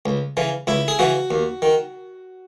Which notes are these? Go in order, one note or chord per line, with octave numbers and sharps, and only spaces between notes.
C#2
C#3 E3
C#2 E4
G#4
C#3 E3 F#4
D#2
D#3